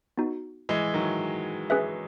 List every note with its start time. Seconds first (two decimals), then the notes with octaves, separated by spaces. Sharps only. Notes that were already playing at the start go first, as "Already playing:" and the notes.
0.17 B3 D#4 F#4
0.69 E3 G#3
0.94 D#3 F#3
1.70 C#4 G#4 B4 E5